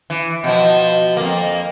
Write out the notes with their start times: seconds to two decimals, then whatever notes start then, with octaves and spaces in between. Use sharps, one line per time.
0.10 E3
0.44 B2 F3
1.17 F2 A#3